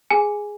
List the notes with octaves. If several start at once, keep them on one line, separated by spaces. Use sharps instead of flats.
G#4 G#5